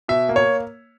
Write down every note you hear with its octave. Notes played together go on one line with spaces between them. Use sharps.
B2 E5
A#3
C#5